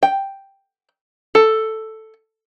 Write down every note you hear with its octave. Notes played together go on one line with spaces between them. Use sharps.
G5
A4